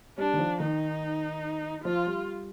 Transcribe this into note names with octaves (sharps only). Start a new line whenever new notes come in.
G3 D4
D#3
F3
D#3 D#4
F3 F4
G3